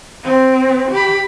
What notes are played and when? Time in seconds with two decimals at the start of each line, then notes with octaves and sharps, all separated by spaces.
0.24 C4
0.91 G4 B5